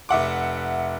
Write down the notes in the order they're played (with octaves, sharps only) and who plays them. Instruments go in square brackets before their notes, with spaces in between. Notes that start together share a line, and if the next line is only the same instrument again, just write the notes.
[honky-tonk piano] F1 E5 F#5 D6